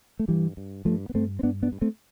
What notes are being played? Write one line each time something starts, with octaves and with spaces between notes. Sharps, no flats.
A3
G2 E3 G3
G2
G2 F3 A3
B3
G2 A3 C4
C4
G2 B3 D4
B3 D4
G2
A3 C4